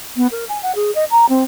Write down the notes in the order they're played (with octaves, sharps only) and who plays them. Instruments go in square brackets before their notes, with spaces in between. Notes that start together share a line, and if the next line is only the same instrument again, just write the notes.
[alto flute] B3
A#4
G#5
F#5
G#4
D#5
A#5
C4